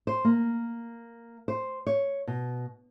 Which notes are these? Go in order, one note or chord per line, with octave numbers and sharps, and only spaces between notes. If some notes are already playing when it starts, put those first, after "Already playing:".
C5
A#3
C5
C#5
B2